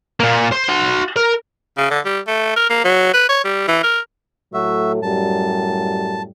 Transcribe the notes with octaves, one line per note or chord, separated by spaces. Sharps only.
A#2 A#3
C5
F#4 C6
A#4
C#3
D3
G3
A3
A#4
A#3
F#3
B4
C#5
G3
E3
A#4
A2 F#3 A3 F#4 E5
F#2 A2 G3 A5